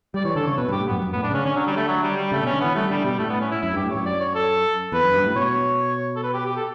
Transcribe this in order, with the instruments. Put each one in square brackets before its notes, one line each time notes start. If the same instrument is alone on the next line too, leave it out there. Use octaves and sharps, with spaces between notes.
[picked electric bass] G3 [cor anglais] D5
[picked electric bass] E3 [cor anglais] C#5
[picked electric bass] D3 [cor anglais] A4
[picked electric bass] C#3 [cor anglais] C#5
[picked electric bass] B2 [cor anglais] B4
[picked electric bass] G2
[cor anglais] G4
[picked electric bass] A2
[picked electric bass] F#2 [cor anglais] B3
[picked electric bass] F#2
[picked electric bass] A2 [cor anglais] B3
[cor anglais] D4
[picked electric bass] C#3 [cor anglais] C#4
[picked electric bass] D3 [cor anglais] C#4
[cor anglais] F#3
G3
A3
F#3
G3
G3
[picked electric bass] C#3 [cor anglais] A3
[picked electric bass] B2
[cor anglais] C#4
[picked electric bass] D3
[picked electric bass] E3 [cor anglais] B3
[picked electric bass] G3 [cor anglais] A3
[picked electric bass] D3 [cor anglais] G3
[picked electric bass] B2 [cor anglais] G3
[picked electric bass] A2 [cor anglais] A3
[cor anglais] B3
C#4
E4
[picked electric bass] F#2 [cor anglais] E4
[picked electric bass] G2
[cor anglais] G4
[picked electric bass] A2
[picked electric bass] F#2 [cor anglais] C#5
[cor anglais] D5
C#5
A4
[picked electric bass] E2 [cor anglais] B4
[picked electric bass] F#2
G2
A2
[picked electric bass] B2 [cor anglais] C#5
[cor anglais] A4
B4
G4
G4
A4